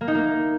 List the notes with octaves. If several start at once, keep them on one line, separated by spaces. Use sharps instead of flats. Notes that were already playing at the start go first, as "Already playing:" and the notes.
A#3
D#4
A#3